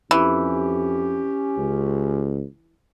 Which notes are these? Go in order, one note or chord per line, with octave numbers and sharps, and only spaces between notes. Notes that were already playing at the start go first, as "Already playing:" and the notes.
F2 E3 C#4 G4
C#2